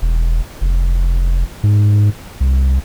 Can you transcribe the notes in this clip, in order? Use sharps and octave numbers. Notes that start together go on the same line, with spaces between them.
E1
F1
G#2
C2